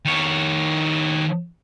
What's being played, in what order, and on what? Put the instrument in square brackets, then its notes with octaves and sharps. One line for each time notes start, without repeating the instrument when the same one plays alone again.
[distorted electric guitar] D#3 C#5